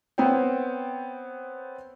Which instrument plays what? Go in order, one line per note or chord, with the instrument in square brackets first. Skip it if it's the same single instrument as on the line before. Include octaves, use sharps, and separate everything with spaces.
[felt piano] B3 C4 C5 C#5 G5